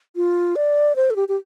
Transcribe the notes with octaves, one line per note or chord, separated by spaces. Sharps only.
F4
D5
C5
A4
G4
G4